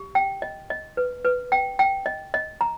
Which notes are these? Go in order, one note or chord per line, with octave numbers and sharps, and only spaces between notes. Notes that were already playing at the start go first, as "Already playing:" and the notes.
Already playing: G4
G5
D#5
D#5
B4
B4
G5
G5
D#5
D#5
A#5